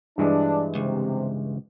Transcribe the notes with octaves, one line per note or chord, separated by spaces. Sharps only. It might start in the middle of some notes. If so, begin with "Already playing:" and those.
G2 E3 G#3 D4
C#2 C3